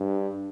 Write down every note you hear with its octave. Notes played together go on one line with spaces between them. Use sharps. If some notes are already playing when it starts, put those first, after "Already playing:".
Already playing: G2